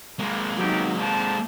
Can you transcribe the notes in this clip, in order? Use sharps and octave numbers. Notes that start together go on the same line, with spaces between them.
A#1 G#3 A#3
C#2 F#3 B3 D#4 G4
D3 F3 C4 A5